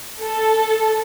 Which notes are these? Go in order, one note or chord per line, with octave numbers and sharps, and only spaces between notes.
A4